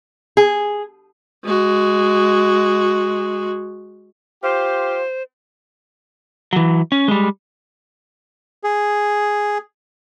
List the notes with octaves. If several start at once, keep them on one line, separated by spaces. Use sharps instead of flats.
G#4
G#3 F#4
F4 G4 C5
E3 F#3
C#4
G3 G#3
G#4